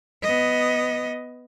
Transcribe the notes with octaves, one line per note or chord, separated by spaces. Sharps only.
B3 D#5